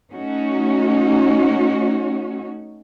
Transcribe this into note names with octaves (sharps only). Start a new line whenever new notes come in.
A3 C#4 D#4 F#4 C#5